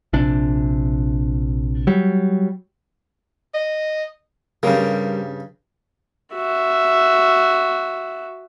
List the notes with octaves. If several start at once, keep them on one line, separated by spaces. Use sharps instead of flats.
A#1 C3 D4
F#3 G3
D#5
G2 C#3 G3 C4 A#4
F#4 E5